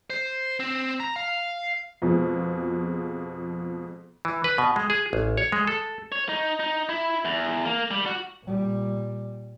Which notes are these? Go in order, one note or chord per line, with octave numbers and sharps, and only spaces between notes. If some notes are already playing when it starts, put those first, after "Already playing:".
C5
C4
A#5
F5
F2 B2 F3 G#3
E3
B4
B2
G#3
G#4
A1
C#5
G#3
A4
C#5
D#4
D#4
E4
E2
A#3
G3
F#4
A#2 G3